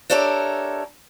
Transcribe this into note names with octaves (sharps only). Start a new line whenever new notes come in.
D4 G4 A4 A#4 C#5 E5